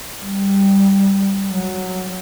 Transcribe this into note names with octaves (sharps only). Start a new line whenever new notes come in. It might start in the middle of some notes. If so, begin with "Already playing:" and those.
G3
F#3